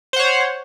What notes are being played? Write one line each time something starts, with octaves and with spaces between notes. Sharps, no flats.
C5 C#5 F#5